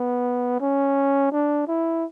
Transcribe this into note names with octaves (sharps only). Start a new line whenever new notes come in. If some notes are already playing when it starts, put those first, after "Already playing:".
Already playing: B3
C#4
D4
E4